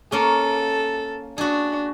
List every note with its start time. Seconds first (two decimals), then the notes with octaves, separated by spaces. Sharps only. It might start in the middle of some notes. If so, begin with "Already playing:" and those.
0.12 A#3 C#4 A4
1.38 D4 F#4 G#4